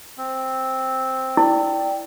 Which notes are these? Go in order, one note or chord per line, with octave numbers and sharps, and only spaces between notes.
C4
E4 D5 G5